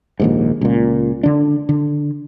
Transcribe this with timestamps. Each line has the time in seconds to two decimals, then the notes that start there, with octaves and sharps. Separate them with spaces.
0.20 A#1 D#2 G#2
0.61 C#2 A#2
1.23 D3 D4
1.69 D3